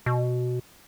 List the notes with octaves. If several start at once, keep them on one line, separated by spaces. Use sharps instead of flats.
B2